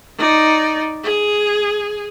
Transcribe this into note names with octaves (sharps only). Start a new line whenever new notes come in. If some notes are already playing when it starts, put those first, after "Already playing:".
D#4 D5
G#4